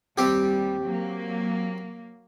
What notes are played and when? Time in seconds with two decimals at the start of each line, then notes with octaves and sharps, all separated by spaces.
0.18 D#2 G3 C4 G4
0.82 F#3 A#3